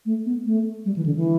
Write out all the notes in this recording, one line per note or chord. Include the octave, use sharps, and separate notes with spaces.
A3
B3
A3
G3
E3
D3
E3